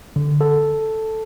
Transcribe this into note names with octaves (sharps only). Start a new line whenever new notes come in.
D3
A4